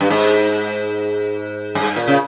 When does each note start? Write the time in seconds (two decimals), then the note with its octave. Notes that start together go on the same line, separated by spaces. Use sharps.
0.01 G2
0.10 G#2
1.75 G2
1.96 A#2
2.08 C#3